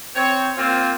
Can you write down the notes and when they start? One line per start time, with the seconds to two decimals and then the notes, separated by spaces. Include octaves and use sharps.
0.16 C4 C#5
0.58 A#3 C4 F4